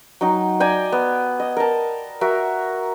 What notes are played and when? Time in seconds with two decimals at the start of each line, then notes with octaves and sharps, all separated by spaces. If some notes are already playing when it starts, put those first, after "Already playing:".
0.21 F#3 D#4 G5
0.60 D5 G5 G#5 A#5
0.92 B3
1.40 D#5
1.57 A#4 A5
2.21 F#4 A#4 E5